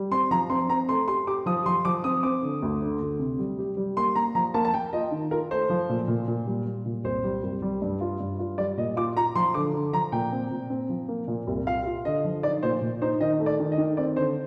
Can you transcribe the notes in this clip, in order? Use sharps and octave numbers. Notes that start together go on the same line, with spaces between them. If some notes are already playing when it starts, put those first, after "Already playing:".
Already playing: G3
C4 C6
F3 A#5
C4 C6
C4 A#5
A3 C6
G4 C6
G4 D6
F3 D#6
F3 C6
F3 D6
C4 D#6
C4 D6
D3
D2
D3
D2
C3
G3
G4
G3
A#3 C6
A#3 A#5
F3 A#5
A#3 A5
A5
A#3 G5
F4 D#5
D#3
F4 A#4
A3 C5
F3
A#2
A#2
A#2
G3
G3
A#2
C2 C5
G3
C2
G3
G2
F4
G2
F4
G3 D5
A#2 D#5
F4 D6
F4 A#5
F3 C6
D3 D6
D3
F3 A#5
A#2 G5
C4
A#2
C4
F3
A#3
A#2
C2
F4 F5
F4
D3 D#5
F3
D#4 D5
A#2 C5
A#2
D#4 C5
D#3 D#5
A3
D5
D#3
D#5
D#3
C4 D5
D3 C5